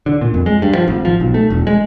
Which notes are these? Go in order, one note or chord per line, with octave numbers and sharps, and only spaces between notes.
D3
A#2
F2
G#3
G2
F3
G#1
F3
B1
A3
E1
G#3